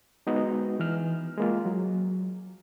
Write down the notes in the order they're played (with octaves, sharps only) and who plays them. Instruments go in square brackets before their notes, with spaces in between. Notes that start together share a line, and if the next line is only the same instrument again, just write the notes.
[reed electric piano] G#3 B3 D#4 F#4
E3 F6
G#3 A#3 F4
F#3